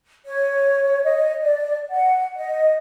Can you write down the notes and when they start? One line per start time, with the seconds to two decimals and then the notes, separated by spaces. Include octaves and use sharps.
0.26 C#5
1.04 D#5
1.43 D5
1.90 F#5
2.36 D#5